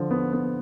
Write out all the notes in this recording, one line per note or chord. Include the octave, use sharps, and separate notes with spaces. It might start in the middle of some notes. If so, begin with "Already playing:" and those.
Already playing: D3 F3
B3
B3